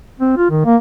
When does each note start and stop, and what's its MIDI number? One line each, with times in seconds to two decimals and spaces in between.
0.20 0.33 60
0.38 0.50 65
0.51 0.63 51
0.65 0.77 58